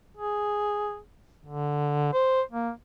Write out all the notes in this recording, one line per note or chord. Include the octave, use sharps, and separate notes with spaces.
G#4
D3
C5
A#3